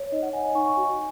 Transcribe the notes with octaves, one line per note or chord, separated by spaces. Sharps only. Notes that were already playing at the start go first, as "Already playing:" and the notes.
Already playing: C#5
D#4 D#5
F#5
C#5 D#5 G#5
D#5 G#5
D#4 G#5 C#6
G#5 C#6
F#4